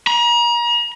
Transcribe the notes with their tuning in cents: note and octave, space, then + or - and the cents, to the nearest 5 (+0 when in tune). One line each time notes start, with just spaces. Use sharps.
A#5 +35